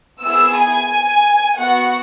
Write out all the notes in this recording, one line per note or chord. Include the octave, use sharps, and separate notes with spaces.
B3 E4 G#4 E6
G#5
B3 F#4 F#5